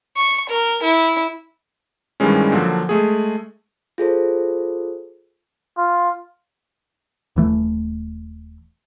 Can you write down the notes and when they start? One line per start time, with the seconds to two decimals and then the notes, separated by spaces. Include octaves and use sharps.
0.17 C#6
0.49 A#4
0.83 E4
2.20 G2 D#3 E3 G3 G#3 C#4
2.52 A#2 D3 F3 F#3
2.89 G#3 A3 G#4
3.98 F4 G#4 A4 C5
5.78 F4
7.36 D#1 E3 A3